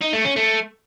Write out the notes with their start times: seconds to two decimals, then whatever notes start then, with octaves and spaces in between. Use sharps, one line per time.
0.01 D#4
0.13 A3
0.25 C#4
0.36 A3